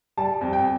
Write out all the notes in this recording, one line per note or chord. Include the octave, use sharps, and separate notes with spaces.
G3 A5
F2
G5